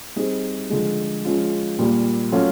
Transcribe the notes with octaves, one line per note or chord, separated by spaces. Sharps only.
G3 C4 D#4 G#4
D3 F3 G#3
F3 G#3 C#4 F4
A#2 G3 A#3
F#3 A3 C#4 F4